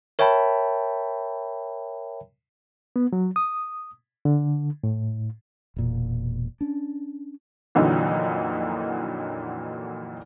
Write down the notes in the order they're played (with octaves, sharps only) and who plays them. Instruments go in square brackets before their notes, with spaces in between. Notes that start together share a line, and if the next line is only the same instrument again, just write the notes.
[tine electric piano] A#4 C#5 E5 G5 A5 B5
[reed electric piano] B3
F#3
D#6
D3
A2
[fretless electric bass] E1 A#2
C#4 D4
[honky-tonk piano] F2 A#2 D3 E3 F#3 D#4